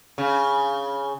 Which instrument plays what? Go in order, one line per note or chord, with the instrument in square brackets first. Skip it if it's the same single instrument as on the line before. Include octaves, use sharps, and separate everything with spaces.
[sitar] C#3